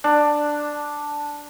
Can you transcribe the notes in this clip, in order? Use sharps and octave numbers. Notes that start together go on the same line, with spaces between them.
D4